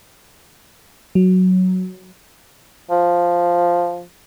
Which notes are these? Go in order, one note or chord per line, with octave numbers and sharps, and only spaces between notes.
F#3
F3